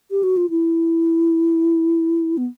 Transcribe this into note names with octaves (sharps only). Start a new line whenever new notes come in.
G4
F#4
F4
E4
B3